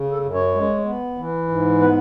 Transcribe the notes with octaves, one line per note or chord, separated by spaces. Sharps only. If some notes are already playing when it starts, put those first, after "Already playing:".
Already playing: C#3
A4
F#2
C#5
G#3
B3
E3
G#2
B3 B4